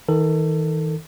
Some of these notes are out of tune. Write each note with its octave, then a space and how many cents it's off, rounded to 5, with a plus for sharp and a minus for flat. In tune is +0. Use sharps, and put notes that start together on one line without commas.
D#3 +40 A4 +25